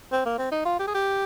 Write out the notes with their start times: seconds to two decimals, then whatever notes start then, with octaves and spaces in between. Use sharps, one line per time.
0.12 C4
0.26 A#3
0.39 C4
0.52 D#4
0.65 F4
0.79 G4
0.87 G#4
0.95 G4